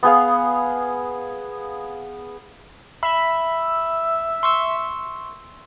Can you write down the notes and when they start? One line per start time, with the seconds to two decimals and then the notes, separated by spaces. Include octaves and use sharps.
0.03 B3 G#4 F5
3.03 E5 B5
4.43 C6 C#6 E6